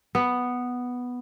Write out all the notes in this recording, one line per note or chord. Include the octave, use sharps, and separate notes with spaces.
B3